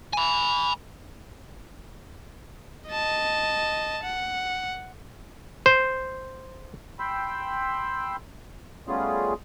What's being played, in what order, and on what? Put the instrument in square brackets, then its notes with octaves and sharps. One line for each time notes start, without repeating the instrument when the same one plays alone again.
[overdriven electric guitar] G#5 B5
[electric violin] D#5 A5
F#5
[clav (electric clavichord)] C5
[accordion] G5 B5 C6 E6
G3 A3 B3 C#4 F4 G#4